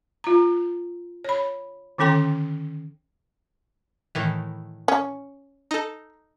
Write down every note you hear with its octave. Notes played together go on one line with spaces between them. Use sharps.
F4 A#5
C#5 B5
D3 D#3 C#4 A4 G5 C6
A2 D#3 E3
C#4
D#4 A4